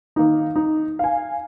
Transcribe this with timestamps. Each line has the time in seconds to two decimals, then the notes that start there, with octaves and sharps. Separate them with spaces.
0.16 D#3 A#3 D#4
0.56 D#4
0.99 F5 G#5